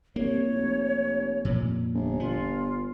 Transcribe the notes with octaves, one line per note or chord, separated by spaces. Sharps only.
C2 A#3 C#5
F1
F2 A#2
G1
B3 F4